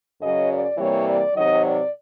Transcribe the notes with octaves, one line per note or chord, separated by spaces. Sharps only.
F#2 C#3 F#3 D#5
D5
C3 E3 G3 A#3 C#5
D5
C3 D#3 F#3 D#5
D5